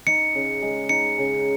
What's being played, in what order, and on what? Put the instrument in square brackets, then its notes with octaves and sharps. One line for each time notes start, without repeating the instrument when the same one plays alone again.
[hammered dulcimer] D#4 [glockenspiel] C#7
[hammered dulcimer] C#3
G#3
[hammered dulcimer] D#4 [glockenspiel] C#7
[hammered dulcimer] C#3